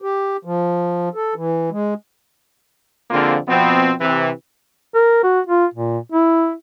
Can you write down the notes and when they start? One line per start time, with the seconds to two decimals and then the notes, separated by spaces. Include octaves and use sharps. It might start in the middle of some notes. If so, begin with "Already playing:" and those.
0.02 G4
0.45 F3
1.15 A4
1.35 E3
1.71 G#3
3.10 F2 D3 A#3 C4 F4 G#4
3.48 B2 F3 B3 C4
4.00 C3 E3
4.95 A#4
5.23 F#4
5.47 F4
5.74 A#2
6.12 E4